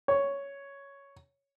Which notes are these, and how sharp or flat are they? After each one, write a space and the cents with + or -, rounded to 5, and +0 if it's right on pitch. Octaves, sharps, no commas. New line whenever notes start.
C#5 +5